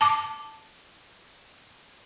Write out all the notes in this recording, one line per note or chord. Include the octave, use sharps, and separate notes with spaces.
A5 D6